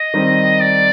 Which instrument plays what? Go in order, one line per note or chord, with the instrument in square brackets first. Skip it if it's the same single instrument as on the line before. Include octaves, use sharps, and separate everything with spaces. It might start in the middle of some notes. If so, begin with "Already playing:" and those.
Already playing: [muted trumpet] D#5
[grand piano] D#3 G3 C4 D#4
[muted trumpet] D5